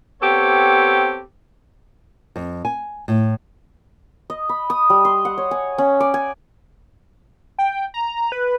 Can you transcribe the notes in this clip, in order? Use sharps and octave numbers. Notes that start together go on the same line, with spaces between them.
B3 C4 G4 A4 C#5
F2
G#5
A2
D#5
B5
D#6
G3
C6
F#5
C#5
G#5
C#4
D5
G#5
G5
A#5
B4